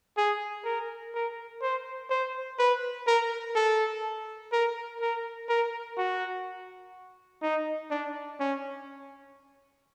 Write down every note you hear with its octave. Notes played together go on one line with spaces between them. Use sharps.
G#4
A#4
A#4
C5
C5
B4
A#4
A4
A#4
A#4
A#4
F#4
D#4
D4
C#4